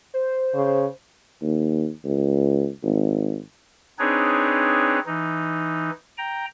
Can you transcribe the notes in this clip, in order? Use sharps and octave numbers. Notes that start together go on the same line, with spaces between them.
C5
C#3
D#2
C#2
G#1
C4 D4 D#4 G#4 B4 C#5
E3 D#4
G5 A#5